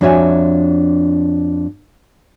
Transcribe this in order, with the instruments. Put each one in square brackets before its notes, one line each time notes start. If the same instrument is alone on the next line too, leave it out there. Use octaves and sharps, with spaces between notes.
[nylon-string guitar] F2 D4 F#4 C#5 E5 G#5